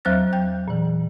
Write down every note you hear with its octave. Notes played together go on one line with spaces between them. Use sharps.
E2 F#3 C4 C5 F6 A6
G5 G6
A#2 E3